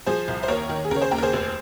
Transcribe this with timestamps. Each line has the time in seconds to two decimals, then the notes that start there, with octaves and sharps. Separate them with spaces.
0.06 F3 G#4 C5
0.28 C2
0.43 C5
0.48 D#2 A#4 C#5
0.69 D#3
0.85 G#4
0.91 C#3 A#4 C#5
1.01 G#4 C5
1.11 D#2 G5 A#5
1.18 A#4
1.23 G#4 C5
1.33 F1